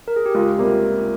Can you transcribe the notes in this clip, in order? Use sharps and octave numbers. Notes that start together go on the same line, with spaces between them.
A#4
G#4
G4
C#2 F4
C3 G3 A#3